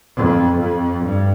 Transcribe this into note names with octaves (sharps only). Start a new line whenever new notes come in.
F2
F2
G2